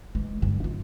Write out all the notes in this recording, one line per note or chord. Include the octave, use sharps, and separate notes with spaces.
E3 G#3
G2 D3
F4